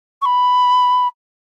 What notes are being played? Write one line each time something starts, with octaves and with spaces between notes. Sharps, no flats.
C#6
B5